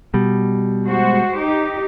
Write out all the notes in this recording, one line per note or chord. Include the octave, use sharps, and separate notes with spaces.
B2 G3
G#3 F#4 C5
D#4 G4